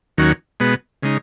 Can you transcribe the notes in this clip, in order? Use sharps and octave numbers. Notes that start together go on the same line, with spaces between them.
D#2 D#3 F#3 C#4 F#4
B2 G#3 B3
C#3 G#3 D#4